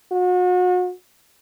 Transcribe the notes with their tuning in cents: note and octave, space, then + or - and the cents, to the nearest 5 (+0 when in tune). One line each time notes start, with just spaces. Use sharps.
F#4 -35